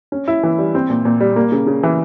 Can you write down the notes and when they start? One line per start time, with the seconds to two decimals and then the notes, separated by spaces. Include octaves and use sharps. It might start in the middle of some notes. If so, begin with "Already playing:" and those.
0.12 C#4
0.28 E4
0.43 E3
0.59 G3
0.75 C4
0.90 A#2
1.05 A#2
1.20 G3
1.36 A#3
1.52 C#3
1.67 C#3
1.83 E3